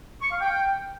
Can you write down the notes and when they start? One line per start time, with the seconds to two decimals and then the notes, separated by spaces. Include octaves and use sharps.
0.22 C#6
0.31 F5
0.41 G5